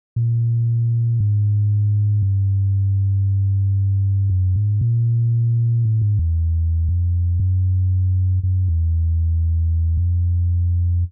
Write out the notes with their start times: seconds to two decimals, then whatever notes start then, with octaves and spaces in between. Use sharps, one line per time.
0.16 A#2
1.20 G#2
2.22 G2
4.30 F#2
4.56 G#2
4.81 A#2
5.85 A2
6.01 G#2
6.19 E2
6.88 F2
7.40 F#2
8.43 F#2
8.68 E2
9.97 F2